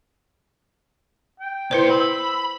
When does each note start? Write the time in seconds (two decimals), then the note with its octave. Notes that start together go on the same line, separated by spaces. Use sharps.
1.40 G5
1.71 A#2 E4 B4 C5 C6
1.90 B5 E6